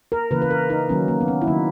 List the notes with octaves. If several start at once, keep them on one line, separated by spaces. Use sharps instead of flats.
A#4
C#3 E3 A#3 B4
B4
A#4
D#4
D#3 F#3 A#3 C#4
A#3
B3
C#4
E4
D#3 F#3 A#3 D#4